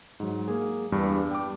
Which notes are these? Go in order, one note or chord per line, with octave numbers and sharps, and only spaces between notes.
G#2 F#3
A#3 G#4
E2 G2 G3
G5 D6